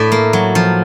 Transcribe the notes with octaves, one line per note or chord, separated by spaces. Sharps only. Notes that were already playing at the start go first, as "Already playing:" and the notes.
Already playing: A2 D5 E5
A#3
F#3
F3